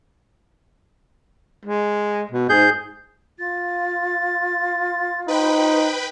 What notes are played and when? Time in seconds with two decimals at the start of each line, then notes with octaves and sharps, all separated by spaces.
1.65 G#3
2.32 B2
2.49 G#2 G#4 G6
3.39 F4 A6
5.28 D#4 B4 C5 G5 B5